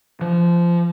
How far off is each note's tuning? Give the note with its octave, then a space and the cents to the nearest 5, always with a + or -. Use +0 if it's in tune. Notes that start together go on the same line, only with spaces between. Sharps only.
F3 -20